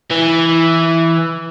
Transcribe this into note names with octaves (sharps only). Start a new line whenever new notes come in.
E3